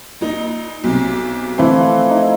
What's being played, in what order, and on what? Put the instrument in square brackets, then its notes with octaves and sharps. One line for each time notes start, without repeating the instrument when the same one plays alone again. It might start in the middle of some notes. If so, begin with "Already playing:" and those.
[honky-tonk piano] A#1 D#4
B1 C3
[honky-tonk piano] E3 C4 [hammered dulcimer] F3 A3 E4
[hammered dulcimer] D#4 E4